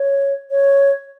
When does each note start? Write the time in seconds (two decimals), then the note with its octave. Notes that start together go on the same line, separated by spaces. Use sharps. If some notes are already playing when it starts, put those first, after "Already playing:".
Already playing: C#5
0.51 C#5